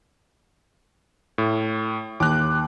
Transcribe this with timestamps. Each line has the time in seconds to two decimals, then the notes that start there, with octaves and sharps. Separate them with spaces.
1.38 A2
2.20 D#2 D6 F#6